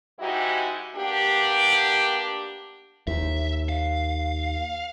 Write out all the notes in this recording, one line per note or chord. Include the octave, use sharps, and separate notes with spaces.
G#2 G#3 D#4 E4 F#4 G4
A#3 B3 D4 G4
D#2 E5
F5